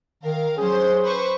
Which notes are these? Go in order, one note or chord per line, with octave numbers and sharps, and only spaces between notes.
D#3 A#4 F5
F#3 C#4 G#4 C5
B4 C5 C#6